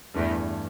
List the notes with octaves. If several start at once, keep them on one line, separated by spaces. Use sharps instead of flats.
E2 G2 E3 A3